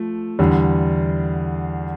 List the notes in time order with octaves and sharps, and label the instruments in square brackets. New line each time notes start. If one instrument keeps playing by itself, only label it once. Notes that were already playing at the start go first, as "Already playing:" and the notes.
Already playing: [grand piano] F3 A3
E2 D3 G3